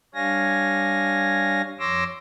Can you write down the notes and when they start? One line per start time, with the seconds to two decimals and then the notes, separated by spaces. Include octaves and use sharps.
0.15 G3 D4 C#5 F5 G#5 A#6
1.79 F2 C#5 C6 D6 E6 A#6